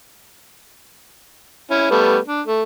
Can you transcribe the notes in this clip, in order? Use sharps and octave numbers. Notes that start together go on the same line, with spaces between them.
C#4 E4
G3 A3 B3
D4
A3